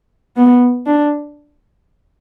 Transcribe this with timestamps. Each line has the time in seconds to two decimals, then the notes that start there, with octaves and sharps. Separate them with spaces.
0.36 B3
0.86 D4